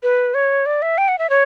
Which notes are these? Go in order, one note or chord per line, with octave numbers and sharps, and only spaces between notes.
B4
C#5
D5
E5
G5
F#5
E5
C#5